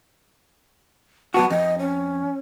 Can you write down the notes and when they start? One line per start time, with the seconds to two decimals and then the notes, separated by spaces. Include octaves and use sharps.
1.34 F#3 B3 F#4 A5
1.50 F2 D#5
1.79 C#4